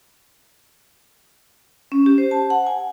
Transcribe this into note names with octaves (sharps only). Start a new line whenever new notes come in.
C#4
G4
C5
A5
F#5
G#5